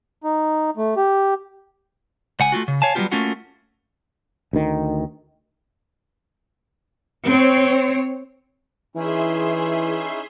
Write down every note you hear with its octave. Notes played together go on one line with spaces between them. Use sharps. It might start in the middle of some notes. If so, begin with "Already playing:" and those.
D#4
A3
G4
C#2 F#5 G#5
A3 C4 F4 F#4
C#3
C#5 F5 G#5 A5
F#3 G3 A#3 B3 F4 G4
A3 A#3 C#4 F4 F#4
D2 D#3
C4 C#5
E3 C#4 D#4 E4 G#4 E5 C6